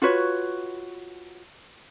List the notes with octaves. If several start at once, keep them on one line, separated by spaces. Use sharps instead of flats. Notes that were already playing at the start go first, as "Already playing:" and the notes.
F4 F#4 B4 C#5